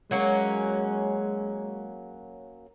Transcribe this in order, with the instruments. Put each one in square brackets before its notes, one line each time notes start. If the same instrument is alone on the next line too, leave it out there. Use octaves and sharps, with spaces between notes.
[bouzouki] F#3 A#3 C#4 [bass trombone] G#3